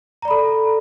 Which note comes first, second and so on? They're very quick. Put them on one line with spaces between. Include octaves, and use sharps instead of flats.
A#5 D5 B5 A4